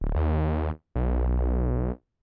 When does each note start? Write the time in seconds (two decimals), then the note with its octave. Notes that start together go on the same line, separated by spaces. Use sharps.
0.01 D1
0.16 D#2
0.95 B1